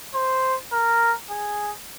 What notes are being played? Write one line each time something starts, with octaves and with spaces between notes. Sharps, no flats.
C5
A#4
G#4